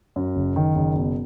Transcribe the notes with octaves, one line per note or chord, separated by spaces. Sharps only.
F#2
F#1
D#3
F#1
B2